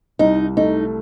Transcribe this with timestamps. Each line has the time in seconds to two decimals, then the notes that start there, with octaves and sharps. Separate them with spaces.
0.19 C2 D#4
0.57 A3 D#4